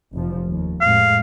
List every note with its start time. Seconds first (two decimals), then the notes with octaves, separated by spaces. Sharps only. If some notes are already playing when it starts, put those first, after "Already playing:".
0.13 F1 F3
0.46 D#2
0.81 F2 A2 G#3 F5